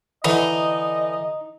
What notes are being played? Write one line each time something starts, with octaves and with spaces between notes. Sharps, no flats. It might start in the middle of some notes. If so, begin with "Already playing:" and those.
D3 E3 D#4 D#5